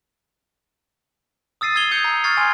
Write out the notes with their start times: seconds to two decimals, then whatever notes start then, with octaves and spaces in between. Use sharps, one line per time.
1.61 D#6 E6 A6 C7 D#7
1.76 E6 G#6 C7 F7 G7
1.91 D#6 G6 C#7
2.04 A#5
2.24 C#6 F6 G#6 A6 C7
2.37 G#5 C6 E6